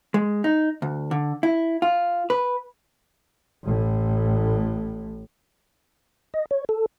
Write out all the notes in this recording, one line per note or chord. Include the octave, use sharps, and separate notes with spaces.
G#3
D#4
D2
D3
E4
F4
B4
A1 A2
D#5
C#5
A4